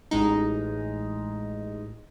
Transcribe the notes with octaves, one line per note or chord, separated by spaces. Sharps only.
A1 G#3 D#4